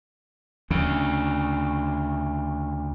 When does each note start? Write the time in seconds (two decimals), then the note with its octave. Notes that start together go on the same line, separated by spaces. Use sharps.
0.71 D2 C#3